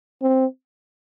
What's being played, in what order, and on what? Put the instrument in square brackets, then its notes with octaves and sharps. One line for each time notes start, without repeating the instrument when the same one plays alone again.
[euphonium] C4